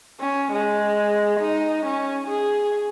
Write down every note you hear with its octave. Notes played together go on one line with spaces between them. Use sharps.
C#4
G#3
D#4
C#4
G#4